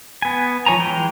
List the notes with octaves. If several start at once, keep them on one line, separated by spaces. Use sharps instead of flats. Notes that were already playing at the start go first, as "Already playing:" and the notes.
B3 G#5
F3 C#5 G#5 A#5
E3 G#3 G5